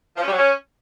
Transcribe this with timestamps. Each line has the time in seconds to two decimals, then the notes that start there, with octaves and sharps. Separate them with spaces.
0.16 F3
0.22 C#4
0.27 G3
0.32 F#3
0.38 C#4